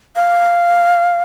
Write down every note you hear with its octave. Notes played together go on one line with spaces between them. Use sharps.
F5